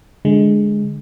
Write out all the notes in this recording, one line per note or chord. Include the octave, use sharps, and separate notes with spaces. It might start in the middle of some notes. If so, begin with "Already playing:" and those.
D3 G#3